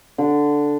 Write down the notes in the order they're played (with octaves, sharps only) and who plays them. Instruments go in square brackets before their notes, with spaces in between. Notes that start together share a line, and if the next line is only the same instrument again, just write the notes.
[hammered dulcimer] D3